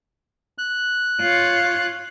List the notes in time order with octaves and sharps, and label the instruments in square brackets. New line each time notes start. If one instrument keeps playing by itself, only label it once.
[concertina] F#6
[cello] F4 C#5